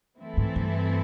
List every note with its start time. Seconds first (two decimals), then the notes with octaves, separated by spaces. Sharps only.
0.19 E3 A3 C4 E4 A4
0.37 G#2
0.56 G2